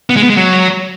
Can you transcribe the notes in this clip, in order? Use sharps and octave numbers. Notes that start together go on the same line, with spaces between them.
B3
G#3
B3
G#3
F#3